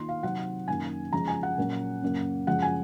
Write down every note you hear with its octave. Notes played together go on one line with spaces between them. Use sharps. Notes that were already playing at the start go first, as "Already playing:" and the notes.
Already playing: D#3 A#3 F4 C6
F5
C3 F#3 C4 D#4 F#5
F#2 D#3 A#3 G#5
C#3 F3 G#3 A#5
G#5
F#5
A#2 F#3 C#4
F#2 C#3 F#3 A#3
F#2 C#3 F3 G#3 F#5
G#5